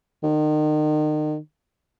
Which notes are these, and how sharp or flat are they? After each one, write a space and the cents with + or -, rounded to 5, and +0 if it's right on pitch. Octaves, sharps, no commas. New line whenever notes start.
D#3 -35